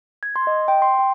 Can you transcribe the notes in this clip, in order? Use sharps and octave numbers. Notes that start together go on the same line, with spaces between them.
G#6
C6
D#5
G5
C6
G5